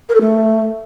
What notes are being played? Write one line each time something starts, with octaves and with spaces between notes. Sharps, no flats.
A#4
A4
A3